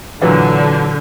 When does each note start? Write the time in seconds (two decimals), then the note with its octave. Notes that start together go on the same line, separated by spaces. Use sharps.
0.21 A#2 D3 E3 F#3